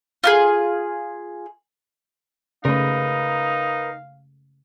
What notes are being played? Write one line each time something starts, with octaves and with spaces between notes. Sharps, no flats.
F4 F#4 G#4
C#3 A3 D#4 A#4 B4 F5